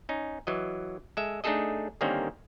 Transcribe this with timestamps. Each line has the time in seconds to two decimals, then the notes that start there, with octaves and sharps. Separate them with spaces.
0.09 C#4 D#4
0.47 E3 F#3 D#5
1.17 G#3 A4 E5
1.44 A3 D4 D#4 G#4 A4 D#5
2.01 D3 D#3 G3 A#3 C4 C#4